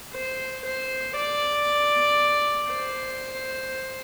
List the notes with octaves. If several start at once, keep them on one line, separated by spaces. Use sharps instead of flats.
C5
C5
D5
C5